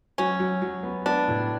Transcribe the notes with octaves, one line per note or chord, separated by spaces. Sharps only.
F#3 C#4
F#3
F#3
B3
B3 D4
A2